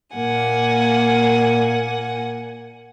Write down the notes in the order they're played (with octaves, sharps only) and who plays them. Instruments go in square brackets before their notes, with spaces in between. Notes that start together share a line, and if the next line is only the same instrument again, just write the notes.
[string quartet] A#2 A#3 F#5 G#5